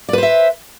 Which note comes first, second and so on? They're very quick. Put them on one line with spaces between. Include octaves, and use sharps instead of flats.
D5 B4 C5 E5